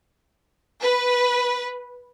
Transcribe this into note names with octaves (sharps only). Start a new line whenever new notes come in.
B4